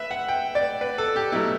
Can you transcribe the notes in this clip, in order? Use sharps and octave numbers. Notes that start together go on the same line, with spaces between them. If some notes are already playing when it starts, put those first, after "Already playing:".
Already playing: B4 E5
F#5
G5
D5
B4
A4
G4
B2 F#3 A3 E4